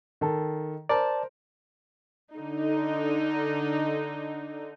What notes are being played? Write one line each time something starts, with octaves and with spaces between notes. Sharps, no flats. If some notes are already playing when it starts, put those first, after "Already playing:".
D#3 A4
A#4 C5 D5 A5
D3 D#4